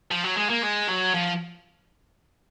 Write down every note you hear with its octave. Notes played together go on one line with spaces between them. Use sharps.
F3
F#3
G#3
A#3
G#3
F#3
F3